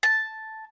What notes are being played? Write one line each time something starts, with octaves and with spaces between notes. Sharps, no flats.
A5